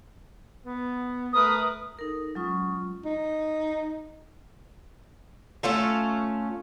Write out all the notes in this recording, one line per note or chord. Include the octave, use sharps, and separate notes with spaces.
B3
A3 A#4 B4 D#6
D#4 A4 A#4 D#6
F#3 G#3 C#4 F4 C#6 D#6
D#4
A3 C#4 F4 A4